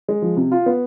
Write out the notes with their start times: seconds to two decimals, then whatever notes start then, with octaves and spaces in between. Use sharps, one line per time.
0.08 G#3
0.22 F3
0.37 C3
0.52 F4
0.66 B3